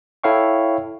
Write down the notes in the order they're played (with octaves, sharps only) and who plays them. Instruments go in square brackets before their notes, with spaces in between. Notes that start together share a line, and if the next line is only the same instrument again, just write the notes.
[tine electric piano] E4 A4 C#5 F5 G5 C#6